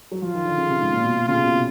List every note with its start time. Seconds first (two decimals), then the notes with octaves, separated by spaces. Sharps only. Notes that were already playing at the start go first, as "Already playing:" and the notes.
0.11 F#3
0.22 F3 F4
0.35 D#3
0.45 D3
0.57 C#3
0.70 C3
0.81 G#2
0.93 A#2
1.04 B2
1.16 B2
1.28 C#3 F4
1.35 C3
1.43 B2
1.50 C3